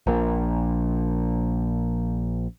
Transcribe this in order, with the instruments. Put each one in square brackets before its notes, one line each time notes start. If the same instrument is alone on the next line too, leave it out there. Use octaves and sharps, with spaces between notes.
[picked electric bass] A#1 A#2